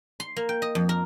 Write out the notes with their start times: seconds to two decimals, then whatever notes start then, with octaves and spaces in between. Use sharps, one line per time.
0.20 C6
0.36 A#3
0.49 G5
0.62 D#5
0.75 F2
0.89 A#4